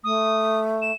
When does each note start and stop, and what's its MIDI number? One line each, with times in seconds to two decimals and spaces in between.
0.04 0.92 57
0.04 0.60 87
0.82 0.95 100